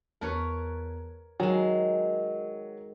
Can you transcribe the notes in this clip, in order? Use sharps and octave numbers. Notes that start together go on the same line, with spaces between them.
E2 A#4 B4 C#5 A5
D#3 F#3 G#3